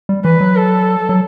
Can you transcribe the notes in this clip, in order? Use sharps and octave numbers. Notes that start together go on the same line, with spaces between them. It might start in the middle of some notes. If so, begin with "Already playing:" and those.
G3
E3 B4
F#3
A4
F#3